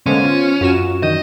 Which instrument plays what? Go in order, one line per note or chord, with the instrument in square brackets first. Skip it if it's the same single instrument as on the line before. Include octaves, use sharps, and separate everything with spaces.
[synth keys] D3 G#3 A#3 [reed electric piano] B3 C5 [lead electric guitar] C#4
[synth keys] F4
[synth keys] F#2 F#4 E7 [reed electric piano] F4
[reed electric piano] D#3 D4 G6 [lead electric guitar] D#5